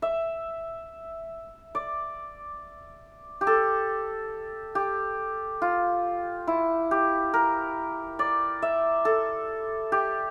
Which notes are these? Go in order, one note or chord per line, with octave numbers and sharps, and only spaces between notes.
E5
D5
G4
A4
G4
F4
E4
G4
A#4
D5
E5
A4
G4